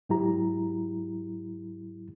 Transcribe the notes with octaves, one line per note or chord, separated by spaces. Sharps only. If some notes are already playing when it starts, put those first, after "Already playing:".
G#2 F#3 E4 G4 A#5